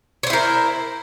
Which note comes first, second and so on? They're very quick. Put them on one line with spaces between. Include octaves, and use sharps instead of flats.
C#5 C5 E4 A#4